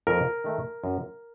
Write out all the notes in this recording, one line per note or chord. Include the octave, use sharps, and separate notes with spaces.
F2 A#4
D#3 A3
F#2